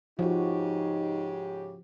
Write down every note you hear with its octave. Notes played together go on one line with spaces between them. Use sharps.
G#2 C#3 F3 D#4 F#4 G4